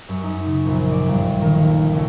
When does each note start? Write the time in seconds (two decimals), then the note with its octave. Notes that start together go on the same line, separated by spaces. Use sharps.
0.09 F#2
0.23 D#4
0.47 C#3
0.65 A#1
0.91 D5
1.07 G1
1.41 D#3
1.60 D#2
1.93 C#2